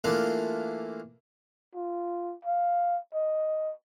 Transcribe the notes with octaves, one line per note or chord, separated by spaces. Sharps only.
E3 A3 A#3 D4 F4
F4
F5
D#5